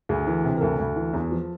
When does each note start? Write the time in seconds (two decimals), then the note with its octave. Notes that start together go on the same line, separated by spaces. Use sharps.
0.09 D2 G#4
0.27 E3
0.44 C3
0.57 A#4
0.61 D2 A4
0.79 D2
0.96 E3
1.13 E2
1.31 F3